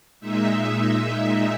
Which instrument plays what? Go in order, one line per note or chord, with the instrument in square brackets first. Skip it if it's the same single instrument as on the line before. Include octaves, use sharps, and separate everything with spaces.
[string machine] A#2 G#3 D#4 E5